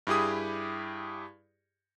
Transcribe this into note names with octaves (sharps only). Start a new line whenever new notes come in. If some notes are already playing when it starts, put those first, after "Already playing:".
G2 E4 G4 G#4 D#6